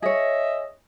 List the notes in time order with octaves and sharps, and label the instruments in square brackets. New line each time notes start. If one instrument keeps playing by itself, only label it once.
[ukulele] G#4 C#5 [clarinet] D#5 [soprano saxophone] E5